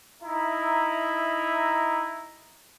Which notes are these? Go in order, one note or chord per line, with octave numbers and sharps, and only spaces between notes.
D#4 E4 E5 A#5